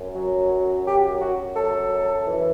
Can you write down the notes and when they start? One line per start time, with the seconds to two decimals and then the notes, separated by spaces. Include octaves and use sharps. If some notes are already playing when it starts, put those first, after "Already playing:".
Already playing: F#2
0.16 F#3
0.51 F#2
0.86 F#3 G4
1.21 F#2 F#4
1.57 F#3 A4
1.92 F#2
2.27 E3